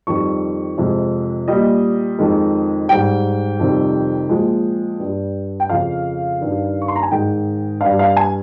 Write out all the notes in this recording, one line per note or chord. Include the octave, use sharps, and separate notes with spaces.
F2 D#3 G3 C#6
F2 C3 F3 G#3
A#2 G3 D#5
F2 D#3 G#3
G#2 G3 G5
F2 C3 D#3 G3
A#2 F3 G#3
G2 G3
G5
F2 C#3 F3 F5
G2 D#3 G3
C#6
C6
A#5
G#5
G#2 D#3 G#3 G5
G2 G3 F5
F5
G#5